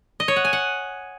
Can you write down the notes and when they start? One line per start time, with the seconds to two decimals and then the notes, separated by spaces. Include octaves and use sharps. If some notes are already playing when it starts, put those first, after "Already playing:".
0.20 D#5
0.28 C#5
0.36 F#5
0.45 G#5
0.53 F#5